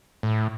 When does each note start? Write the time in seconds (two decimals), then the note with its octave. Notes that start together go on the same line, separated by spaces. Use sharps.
0.23 A2